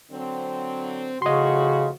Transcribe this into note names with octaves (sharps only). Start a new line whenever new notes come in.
D3 F#3 C4
A2 C#3 F3 F#4 D#5 C6